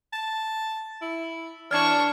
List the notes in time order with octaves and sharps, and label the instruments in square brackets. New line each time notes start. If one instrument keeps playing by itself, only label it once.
[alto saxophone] A5
E4
[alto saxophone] E3 [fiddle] D4 C#6 [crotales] F6 G#6